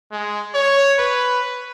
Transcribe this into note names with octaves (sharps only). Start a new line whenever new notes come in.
G#3
C#5
B4